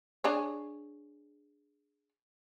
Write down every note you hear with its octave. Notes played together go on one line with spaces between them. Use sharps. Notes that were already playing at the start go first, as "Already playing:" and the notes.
D4 G#4 C#5